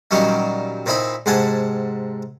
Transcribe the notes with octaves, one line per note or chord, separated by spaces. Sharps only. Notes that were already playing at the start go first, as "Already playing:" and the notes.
A#2 D#3 F#3 G3 C#4 D#4
A#2 C4 D#4 E4 B5
G#2 C3 F#5 G#5 A5